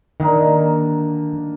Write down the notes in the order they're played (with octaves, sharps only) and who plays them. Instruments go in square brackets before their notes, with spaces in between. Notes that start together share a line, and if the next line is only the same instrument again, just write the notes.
[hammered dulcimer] D3 A#3 D#4 [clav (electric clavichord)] D#3